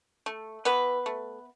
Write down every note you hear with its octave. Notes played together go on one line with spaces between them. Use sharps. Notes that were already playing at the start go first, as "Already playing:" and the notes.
A3
E3 B3 B4
A3